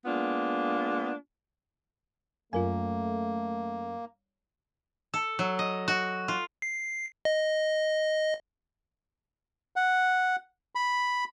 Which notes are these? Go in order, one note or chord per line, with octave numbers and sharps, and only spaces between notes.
G#3 A#3 B3 D4 F4
F#2 A3 A#3 F4 A#4 G#5
A4
F#3
D#5
F#4
F4
C7
D#5
F#5
B5